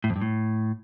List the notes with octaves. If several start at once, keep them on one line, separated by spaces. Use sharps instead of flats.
A2
F2
G2
A2